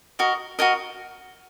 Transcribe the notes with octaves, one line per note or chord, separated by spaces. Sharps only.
F#4 A#4 D#5
F#4 A#4 D#5